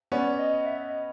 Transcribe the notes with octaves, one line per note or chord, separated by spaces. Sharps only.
B3 C#4 D5
D#5
E5
D#5